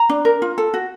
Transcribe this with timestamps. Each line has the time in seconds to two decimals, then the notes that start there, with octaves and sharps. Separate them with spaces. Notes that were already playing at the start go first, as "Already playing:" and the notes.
Already playing: A#5
0.09 D4
0.25 A#4
0.42 F4
0.58 A4
0.74 F#4